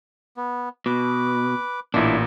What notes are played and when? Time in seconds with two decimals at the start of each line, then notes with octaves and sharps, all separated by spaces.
0.37 B3
0.86 B2 B4 D6
1.94 A1 A#2 D4 E4